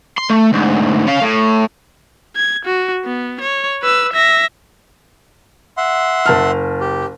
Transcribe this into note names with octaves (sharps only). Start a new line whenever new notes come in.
C6
A3
D2 G#2
C#4 F5
A2
G#6
F#4
B3
C#5
B4 E6
E5 A#6
E5 F#5 C6
F#1 A5 F6
G4